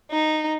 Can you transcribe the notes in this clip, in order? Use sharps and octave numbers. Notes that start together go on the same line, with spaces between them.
D#4